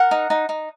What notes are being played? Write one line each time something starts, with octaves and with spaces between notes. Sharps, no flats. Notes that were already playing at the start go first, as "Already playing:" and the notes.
Already playing: A#4 F#5
D#4
D#4
D#4